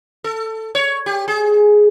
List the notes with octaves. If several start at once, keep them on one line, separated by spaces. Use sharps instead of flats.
A4
C#5
G4
G#4